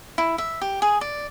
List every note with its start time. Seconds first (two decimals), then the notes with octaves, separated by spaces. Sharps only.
0.18 E4
0.38 E5
0.61 G4
0.82 G#4
1.01 D5